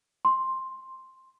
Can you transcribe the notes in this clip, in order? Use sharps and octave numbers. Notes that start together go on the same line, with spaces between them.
C6